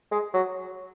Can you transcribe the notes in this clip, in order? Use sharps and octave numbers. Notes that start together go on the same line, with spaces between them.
G#3
F#3